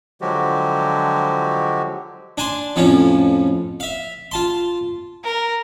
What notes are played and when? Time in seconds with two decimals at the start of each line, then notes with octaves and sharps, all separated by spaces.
0.21 D3 F3 F#3 G#3 F#4 G4
2.38 D4 G#5 A5 C6
2.76 F2 A2 F3 C#4
3.80 E5 F5
4.31 F4 A5 C6
5.24 A#4